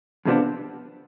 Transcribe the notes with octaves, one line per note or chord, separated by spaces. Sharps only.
F2 C3 F3 B3 D4